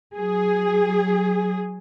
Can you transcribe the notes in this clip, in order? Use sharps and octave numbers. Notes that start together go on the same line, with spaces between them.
F#3 G#4